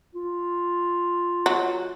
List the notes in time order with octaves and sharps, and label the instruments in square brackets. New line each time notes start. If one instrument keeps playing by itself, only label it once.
[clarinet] F4
[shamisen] F#3